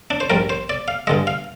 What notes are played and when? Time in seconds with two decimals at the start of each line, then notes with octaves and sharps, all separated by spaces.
0.11 D4
0.20 C5
0.30 A#1 G#2 G3 A#4
0.49 C5
0.70 D5
0.88 F5
1.07 G2 D3 G#3 D#5
1.27 F5